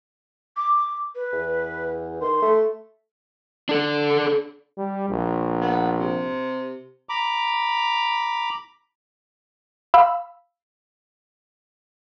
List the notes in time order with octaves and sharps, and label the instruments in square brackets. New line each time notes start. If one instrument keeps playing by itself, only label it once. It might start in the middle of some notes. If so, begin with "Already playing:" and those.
[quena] D6
B4
[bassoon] E2
[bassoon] D#3 [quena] C6
[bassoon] A3
[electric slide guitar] D4 A4
[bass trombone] G3
A#1
[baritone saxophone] B3
C3
[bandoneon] A#5 B5 D6
[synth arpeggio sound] F5 B5 E6